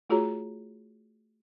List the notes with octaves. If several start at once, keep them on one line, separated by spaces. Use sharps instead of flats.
A3 F4 F#4 G#4 C#5 A#5